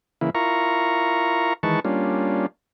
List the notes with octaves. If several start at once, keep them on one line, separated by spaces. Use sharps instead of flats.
C#3 E3 A#3 E4
E4 F4 A#4 A#5 C#6
D#3 E3 G#3 B4 A5 C#6
G3 A#3 C#4 D4 F4